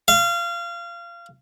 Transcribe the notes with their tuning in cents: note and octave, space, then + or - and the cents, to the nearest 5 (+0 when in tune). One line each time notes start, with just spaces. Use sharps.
F5 -25